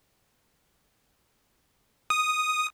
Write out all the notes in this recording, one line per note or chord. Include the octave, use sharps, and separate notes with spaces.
D#6